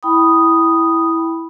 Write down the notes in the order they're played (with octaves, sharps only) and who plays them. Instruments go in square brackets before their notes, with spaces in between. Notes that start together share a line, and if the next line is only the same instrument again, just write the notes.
[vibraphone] E4 G5 B5 D#6